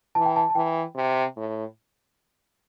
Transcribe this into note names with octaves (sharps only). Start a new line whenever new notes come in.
E3 A5
G5
A5
A5
E3 G5
C3
A2